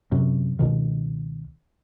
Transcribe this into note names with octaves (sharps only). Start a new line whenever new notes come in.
F#2 C3
C#2 B2 D#3